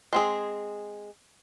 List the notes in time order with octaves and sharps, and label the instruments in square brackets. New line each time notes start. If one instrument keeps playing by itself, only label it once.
[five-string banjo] G#3 C4 G#4